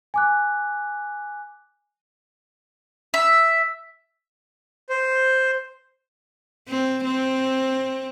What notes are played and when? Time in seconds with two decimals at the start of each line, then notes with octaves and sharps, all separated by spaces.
0.14 G#5 D6 F#6
3.14 E5
4.89 C5
6.69 C4
7.05 C4